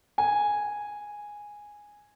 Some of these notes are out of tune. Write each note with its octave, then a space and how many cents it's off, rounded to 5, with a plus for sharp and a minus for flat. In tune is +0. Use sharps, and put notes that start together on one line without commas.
G#5 -5